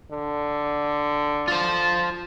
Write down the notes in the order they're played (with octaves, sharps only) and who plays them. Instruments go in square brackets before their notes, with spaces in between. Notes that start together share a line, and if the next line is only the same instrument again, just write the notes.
[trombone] D3
[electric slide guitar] F4 C5